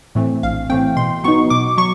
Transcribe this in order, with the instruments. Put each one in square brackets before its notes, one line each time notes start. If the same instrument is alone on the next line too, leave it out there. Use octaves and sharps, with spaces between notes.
[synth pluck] A2 E3 A3 C4
A#1 F5
A2 E3 A3 C4 G5
B2 C6
F#3 B3 D#4 C#6
B2 D6
F#3 C#6